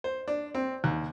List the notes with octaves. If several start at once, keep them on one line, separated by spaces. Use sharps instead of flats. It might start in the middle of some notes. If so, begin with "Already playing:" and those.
C5
D4
C4
D#2